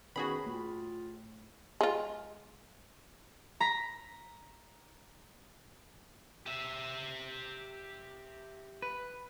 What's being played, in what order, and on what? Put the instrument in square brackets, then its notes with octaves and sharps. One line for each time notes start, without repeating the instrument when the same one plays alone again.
[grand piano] D#3 B3 C#4 [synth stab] F#4 G#4 B5
[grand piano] A2 [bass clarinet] F4
[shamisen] G#3 F4
[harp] A#5 B6
[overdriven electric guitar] G4 E5
[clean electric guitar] B4